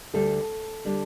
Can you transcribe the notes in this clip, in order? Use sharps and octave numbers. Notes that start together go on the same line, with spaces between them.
D2 D3 G3 A4
D3 G3 D4